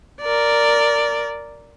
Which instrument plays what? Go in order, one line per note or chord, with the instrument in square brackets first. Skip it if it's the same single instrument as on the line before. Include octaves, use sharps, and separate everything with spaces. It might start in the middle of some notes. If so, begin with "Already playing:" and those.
[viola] A#4 D5